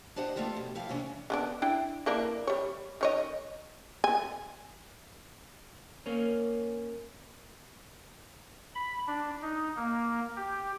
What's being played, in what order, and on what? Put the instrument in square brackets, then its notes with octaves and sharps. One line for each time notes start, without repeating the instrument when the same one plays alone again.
[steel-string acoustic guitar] D4 G4 C5 D#5 F#5
G3 A3 B3 F4 G4
B2
E3 F3 E4 G4 F5
C3 E3 G3 C#4 D4
[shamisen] D3 B3 D4
D4 E4 G5
E3 A#3 D4
G3 C#5
D#3 C#5 D#5
G#5
[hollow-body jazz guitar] A#3 C#4
[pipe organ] B5
D4
D#4
A#3
G4